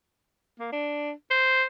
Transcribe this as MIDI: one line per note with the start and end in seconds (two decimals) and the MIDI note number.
0.59 0.70 58
0.72 1.12 62
1.31 1.64 72